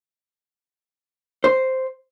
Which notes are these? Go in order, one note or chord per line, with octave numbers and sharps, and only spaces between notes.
C5